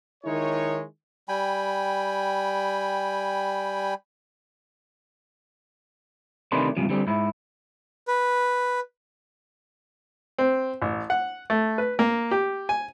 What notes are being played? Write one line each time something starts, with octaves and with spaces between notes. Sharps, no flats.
D#3 G#3 D#4 E4 C#5
G3 G5 G#5 B5
C3 D#3 A3 D4 B4 C6
C#2 G2 C3 F3
D3 G3 C4
G#2 E4
B4
C4
A1
F#5
A3
B4
A#3
G4
G#5